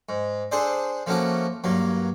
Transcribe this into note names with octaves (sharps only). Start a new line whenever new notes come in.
G#2
D4 G#4 A4 C5 D5
F3 A3 A#3 C#4 F#4 D6
G2 F#3 A#3